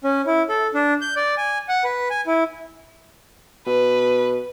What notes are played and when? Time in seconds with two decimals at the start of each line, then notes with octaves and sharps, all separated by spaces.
0.04 C#4
0.26 E4
0.49 A4
0.75 D4
1.01 G6
1.16 D5
1.38 G#5
1.69 F#5
1.84 B4
2.10 G#5
2.27 E4
3.67 B2 B4